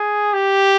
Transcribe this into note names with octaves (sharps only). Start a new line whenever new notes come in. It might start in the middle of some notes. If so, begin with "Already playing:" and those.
Already playing: G#4
G4